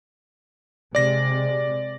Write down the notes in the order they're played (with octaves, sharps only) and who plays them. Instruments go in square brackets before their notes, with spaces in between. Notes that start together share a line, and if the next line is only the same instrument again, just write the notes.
[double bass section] C3 G#3 [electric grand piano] D5 A#6